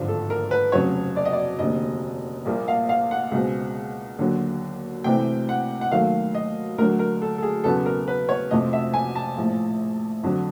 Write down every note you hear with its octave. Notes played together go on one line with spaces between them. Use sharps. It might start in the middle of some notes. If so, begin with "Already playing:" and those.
Already playing: G#1 G2 D3 F3
A4
A#4
B4
F1 F2 C#3 F#3 C#5
D5
D#5
D5
F1 D#2 D3 D#5
A#1 A#2 G3 A#3
F5
F5
F#5
C#2 B2 G#3 C4
D#2 D3 F#3
C2 C3 E3 A3 C4 G5
F#5
F#5
D#2 D#3 F#3 A3 F5
D#5
D2 D3 F#3 A#4
A#4
A4
A4
G#4
E1 E2 C#3 F#3 B3 A4
A#4
B4
C#5
F2 C3 F3 A3 D#5
E5
G#5
A5
A#1 A2 F3
F2 D3 F#3